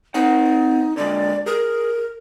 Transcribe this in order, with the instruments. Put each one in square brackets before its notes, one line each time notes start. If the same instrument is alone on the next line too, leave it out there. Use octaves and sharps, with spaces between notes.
[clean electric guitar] C4 C5 F#5 [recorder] D#4
[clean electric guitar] D3 G#3 [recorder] D5
[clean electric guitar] G#4 [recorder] A#4